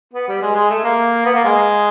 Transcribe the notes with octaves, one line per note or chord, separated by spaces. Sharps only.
B3
G3
G#3
G#3
A3
A#3
B3
A#3
G#3